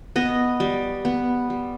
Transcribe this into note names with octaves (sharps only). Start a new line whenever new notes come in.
B3 D#5
G3
B3
G3